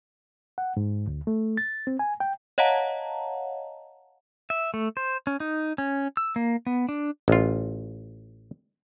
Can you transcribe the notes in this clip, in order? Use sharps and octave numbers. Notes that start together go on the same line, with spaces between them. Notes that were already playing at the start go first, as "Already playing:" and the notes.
F#5
G#2
D2
A3
A6
C4
G#5
G5
C#5 D#5 F5 F#5 A5 A#5
E5
A3
C5
C#4
D#4
C#4
E6
A#3
B3
D4
A1 F4